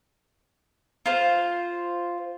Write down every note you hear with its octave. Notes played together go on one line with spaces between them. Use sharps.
F4 C5